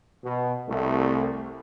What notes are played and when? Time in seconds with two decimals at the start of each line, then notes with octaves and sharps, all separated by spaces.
0.25 B2
0.68 C2 A3